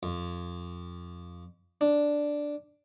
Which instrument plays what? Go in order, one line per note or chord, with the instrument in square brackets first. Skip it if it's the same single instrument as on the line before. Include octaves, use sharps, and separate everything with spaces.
[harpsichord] F2
D4